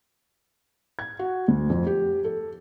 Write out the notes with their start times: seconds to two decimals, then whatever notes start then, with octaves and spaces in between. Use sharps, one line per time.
0.99 G#6
1.19 F#4
1.48 D2
1.70 F2
1.87 G4
2.24 A4